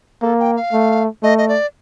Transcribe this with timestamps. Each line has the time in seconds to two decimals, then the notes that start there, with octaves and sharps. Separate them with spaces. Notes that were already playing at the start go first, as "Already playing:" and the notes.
0.22 A#3 A4
0.39 G5
0.56 F5
0.73 A3
1.23 A3 D#5
1.38 D#5
1.48 D5